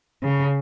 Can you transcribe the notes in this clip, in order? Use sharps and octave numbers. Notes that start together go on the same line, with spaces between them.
C#3